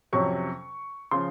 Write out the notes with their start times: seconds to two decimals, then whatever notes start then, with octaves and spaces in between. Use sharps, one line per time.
0.13 F2 C3 F#3 C#4 C#6
1.11 C#3 F3 C6